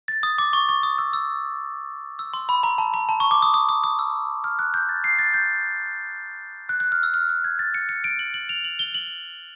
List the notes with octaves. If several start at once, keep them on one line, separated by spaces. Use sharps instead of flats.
A6
D#6
D6
C#6
C#6
D#6
E6
E6
E6
C6
B5
A#5
A5
A#5
A5
C#6
D6
D#6
D#6
D#6
D#6
E6
F6
F#6
G6
A6
C7
A6
G6
F#6
F#6
F6
E6
F6
F#6
G#6
A6
C#7
C#7
D7
F#7
F#7
F7
F#7
G7
F#7